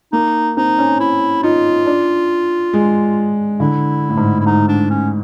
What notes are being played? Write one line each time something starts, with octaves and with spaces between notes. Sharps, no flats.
A#3 D#4
C4 D#4
C#4
E4
D#4 F4
D4
G#3
D3 E4
A2
G#2
E4
G#2 D#4
D4
C#4